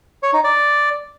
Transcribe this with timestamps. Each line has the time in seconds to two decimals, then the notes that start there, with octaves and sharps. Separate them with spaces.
0.23 C#5
0.33 D#4
0.44 D5